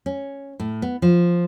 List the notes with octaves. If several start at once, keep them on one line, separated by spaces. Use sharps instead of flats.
C#4
A2
B3
F3